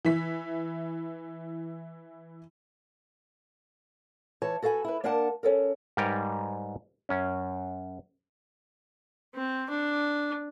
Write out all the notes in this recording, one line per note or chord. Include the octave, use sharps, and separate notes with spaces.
E3 E4 B6
E3 C#5 A5
F#4 A4 B4 F5 G#5
E4 B4
A#3 D4 A#4 F#5 A5
C#4 A4 A#4
G#2 G3 A#4 B4 C#5 G5
F#2 C#4
C4
D4